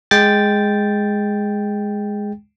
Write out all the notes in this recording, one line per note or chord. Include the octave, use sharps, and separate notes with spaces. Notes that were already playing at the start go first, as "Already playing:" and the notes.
G#3 G5 A6